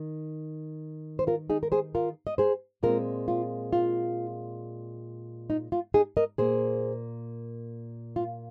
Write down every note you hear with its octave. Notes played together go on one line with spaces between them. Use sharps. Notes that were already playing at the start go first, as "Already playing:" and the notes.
Already playing: D#3
C5
F4 A#4
D#4 G#4
A#4
G#4 C5
F4 A#4
D#5
G#4 C5
A#2 G#3 C4 F4 A#4
F4
F4
D#4
F4
D#4 G#4
A#4 D#5
A#2 A#3 G#4 C5
F4